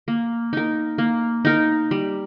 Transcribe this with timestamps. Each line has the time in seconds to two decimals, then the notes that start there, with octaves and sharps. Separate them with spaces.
0.08 A#3
0.53 D#4 A#4
0.98 A#3
1.45 D#4 A#4
1.91 G3